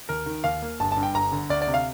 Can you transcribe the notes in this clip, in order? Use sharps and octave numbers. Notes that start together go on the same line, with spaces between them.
D#2 A#4
D#3
D#2 F5
A#3
G1 A5
G2 A5
G5
G1 A#5
D3
D2 D5
D5
C3
F5